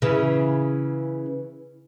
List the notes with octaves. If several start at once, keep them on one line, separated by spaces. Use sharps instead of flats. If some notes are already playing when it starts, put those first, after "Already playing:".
C#3 E3